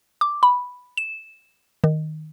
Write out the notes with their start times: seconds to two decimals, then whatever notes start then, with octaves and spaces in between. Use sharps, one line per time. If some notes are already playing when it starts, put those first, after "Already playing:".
0.21 D6
0.43 B5
0.97 E7
1.84 D#3